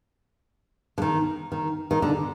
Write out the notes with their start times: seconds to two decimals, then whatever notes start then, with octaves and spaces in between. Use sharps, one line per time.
0.98 D3
1.02 D#3
1.52 D#3
1.91 D#3
2.02 D3